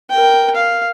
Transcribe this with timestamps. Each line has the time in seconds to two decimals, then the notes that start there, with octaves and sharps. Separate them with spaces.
0.10 A#4 G5
0.55 F5